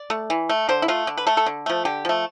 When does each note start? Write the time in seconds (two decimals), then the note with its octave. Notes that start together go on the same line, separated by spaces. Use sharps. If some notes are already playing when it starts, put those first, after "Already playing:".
Already playing: D5
0.10 A3
0.30 E3
0.49 A3
0.69 D3 C5
0.82 E4
0.88 A3 F4
1.07 D3
1.17 B4
1.27 A3 A4
1.37 A4
1.46 D3
1.66 F3 A3
1.85 D3 G4
2.05 F3 A3